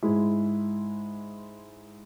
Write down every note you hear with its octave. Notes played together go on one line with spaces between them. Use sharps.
G#2 G#3 E4